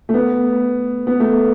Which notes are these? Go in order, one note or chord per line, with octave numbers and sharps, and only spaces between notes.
A3
B3
B3
A3